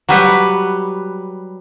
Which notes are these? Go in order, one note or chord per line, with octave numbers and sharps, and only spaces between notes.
F#3 G3 B4 F#5